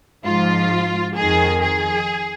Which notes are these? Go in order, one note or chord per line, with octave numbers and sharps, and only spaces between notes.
G#2 F3 F4
F2 D#3 G#4
G#4